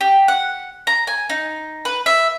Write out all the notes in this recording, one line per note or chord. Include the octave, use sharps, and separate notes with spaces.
G4
F#5
A#5
G#5
D#4
B4
E5